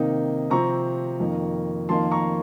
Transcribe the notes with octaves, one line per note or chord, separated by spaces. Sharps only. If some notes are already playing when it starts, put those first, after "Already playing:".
Already playing: C3 D#3 A#3 D#4
C3 F3 C4 A#5 C#6
F2 D#3 A#3
F2 D#3 A#3 A5 C6
A#5 C#6